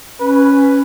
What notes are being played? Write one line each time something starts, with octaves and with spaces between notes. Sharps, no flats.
C#4 B4